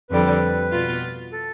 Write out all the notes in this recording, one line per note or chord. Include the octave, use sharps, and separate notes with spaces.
F2 D3 G3 B4
B2 B3 F4
A4